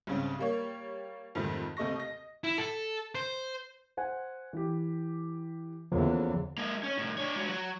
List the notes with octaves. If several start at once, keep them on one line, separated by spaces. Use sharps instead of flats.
C2 G#2 C#3 C4
G3 A#3 C#5
F2 G#2 C3 D#3 G3 A3
D#2 C3 A3 D#5 C#6 A#6
D#5 A#6
E4
A4
C5
C5 F#5 G#5
E3 G4
E2 D3 F3 A#3 C#4
G#3 A#3
C#4 C#5
C2 A2
D4 C#5
G#3 F#4
F#3